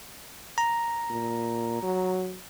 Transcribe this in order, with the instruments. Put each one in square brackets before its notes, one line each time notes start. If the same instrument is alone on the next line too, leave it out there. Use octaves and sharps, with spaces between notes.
[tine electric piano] A#5
[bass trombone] A#2
F#3